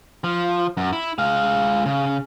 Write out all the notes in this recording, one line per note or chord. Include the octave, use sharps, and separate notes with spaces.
F3
F#2
E4
G#3 F5
C#3